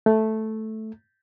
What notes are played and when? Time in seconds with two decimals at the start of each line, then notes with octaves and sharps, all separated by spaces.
0.06 A3